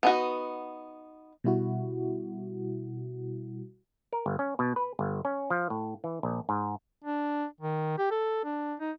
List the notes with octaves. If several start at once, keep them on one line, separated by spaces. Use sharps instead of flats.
B3 D#4 F#4
B2 G3 E4 F#4
A#4
G1
C#4
B2
B4
G1
C#4
F3
A2
E3
A#1
G#2
D4
D#3
G4
A4
D4
D#4